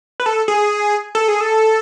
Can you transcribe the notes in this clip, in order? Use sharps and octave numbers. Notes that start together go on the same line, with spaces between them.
B4
A4
G#4
A4
G#4
A4